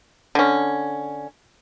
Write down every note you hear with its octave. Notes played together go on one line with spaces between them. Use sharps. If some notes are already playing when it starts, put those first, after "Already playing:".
D3 C#4